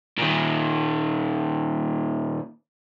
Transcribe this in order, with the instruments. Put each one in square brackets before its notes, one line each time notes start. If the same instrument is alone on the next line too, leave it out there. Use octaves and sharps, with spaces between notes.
[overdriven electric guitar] A#2 D#3